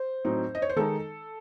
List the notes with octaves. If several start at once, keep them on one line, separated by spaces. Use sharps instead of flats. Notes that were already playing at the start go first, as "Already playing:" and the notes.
Already playing: C5
A2 F#3 C4 D#4
D#5
C#5
C5
D#3 G#3 D#4 A4